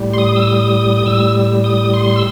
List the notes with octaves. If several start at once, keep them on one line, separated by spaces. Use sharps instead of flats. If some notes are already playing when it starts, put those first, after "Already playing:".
Already playing: A2 G3
C6
D#6
E6
D#6
D#6
A2 G3 E6
D#6
C6
E6